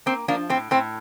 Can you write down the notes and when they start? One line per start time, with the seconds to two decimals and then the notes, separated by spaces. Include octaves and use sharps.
0.06 A#3 C4
0.28 F3 A#3 D4
0.50 A2 C4
0.71 A2 C4